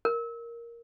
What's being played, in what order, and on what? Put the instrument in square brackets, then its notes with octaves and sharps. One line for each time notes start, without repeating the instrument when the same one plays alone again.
[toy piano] A#4